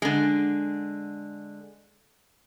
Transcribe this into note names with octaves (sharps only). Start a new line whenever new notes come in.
D3 G#3